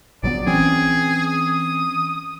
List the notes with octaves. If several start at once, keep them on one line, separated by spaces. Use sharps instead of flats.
A#1 F#3 B3 D5
E3 C4 C#4 G#4
D#6